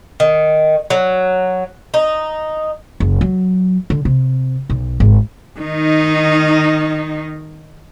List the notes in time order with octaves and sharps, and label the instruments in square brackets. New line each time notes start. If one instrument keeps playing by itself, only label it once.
[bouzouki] D#3
F#3
D#4
[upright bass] F#1
F#3
D3
C3
B1
G#1
[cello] D#3 D#4